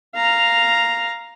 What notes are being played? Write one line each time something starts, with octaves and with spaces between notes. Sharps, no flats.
F5 A#5